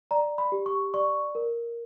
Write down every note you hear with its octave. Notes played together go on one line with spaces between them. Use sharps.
D5 A#5
B5
G4
C#6
D5 C#6
A#4